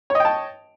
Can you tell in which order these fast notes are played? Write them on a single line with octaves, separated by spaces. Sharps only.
C#5 D#5 G5 A5